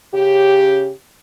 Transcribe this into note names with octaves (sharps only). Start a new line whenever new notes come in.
C#3 C#4 G4